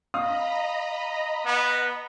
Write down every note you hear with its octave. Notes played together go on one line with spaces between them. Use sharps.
D#5 F5 A#5 B5 D#6
B3